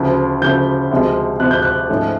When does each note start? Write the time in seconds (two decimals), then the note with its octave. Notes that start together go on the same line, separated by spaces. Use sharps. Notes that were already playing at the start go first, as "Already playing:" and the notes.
Already playing: D2 C#3 F3
0.41 D2 C#3 F3 G6
0.91 D2 C3 F3 G#3
1.40 D2 C3 F3 G#3 F#6
1.51 G6
1.62 F#6
1.89 G#2 F3 A3 C#4